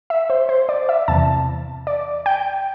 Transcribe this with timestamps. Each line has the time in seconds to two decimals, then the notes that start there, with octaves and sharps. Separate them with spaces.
0.10 E5
0.30 C5
0.49 C5
0.69 D5
0.89 E5
1.08 E2 C3 E3 A5
1.87 D5
2.26 G5